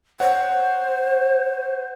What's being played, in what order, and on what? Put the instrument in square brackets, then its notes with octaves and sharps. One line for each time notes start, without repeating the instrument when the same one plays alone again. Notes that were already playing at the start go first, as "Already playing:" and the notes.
[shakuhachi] C5 [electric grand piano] C#5 F#5